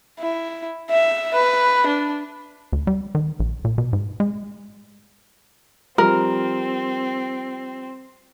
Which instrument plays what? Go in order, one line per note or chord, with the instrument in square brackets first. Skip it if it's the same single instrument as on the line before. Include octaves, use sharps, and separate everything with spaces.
[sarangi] E4
E5
B4
D4
[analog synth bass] D2
G3
D#3
A#1
A#2
B2
G#2
G#3
[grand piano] F3 G3 [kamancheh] C4 [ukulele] A#4